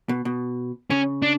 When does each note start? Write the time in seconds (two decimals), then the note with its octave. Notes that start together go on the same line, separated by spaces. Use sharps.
0.09 B2
0.25 B2
0.90 C#3 C#4
1.22 D4